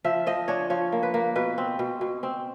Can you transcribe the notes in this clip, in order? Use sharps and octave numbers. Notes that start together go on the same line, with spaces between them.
F3 E5
F3 D#5
D4 C#5
F3 C#5
A#3
B4
A#3
B2 B4
C4
B2
B2
C4